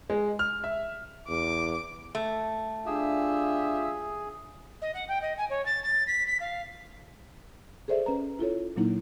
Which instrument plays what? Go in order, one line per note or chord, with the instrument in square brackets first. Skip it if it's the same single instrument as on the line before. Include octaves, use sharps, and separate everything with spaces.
[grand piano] G#3
F6
E5
[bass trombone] E2 [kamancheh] D6
[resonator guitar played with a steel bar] A3
[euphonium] D4 [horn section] F4 G4 E5 [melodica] G#4
[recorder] D#5
F#5
G5
D#5
G#5
C#5
A6
A6
B6
B6
F5
[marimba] G#4 A4 C5 D5 E5
C#4 B4 A#5
E4 F4 A4 C#5
A#2 F#3 A#3 D#4 E4